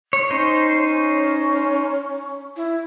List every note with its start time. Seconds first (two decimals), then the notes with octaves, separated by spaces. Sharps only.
0.13 C#5
0.31 C#4 D#4 C5
0.86 C#4
2.56 E4